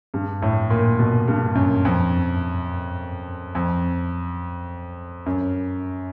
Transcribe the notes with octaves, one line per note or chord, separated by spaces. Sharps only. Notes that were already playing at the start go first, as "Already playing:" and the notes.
G2
A2
A#2
B2
G2
F#2
F2
F2
F#2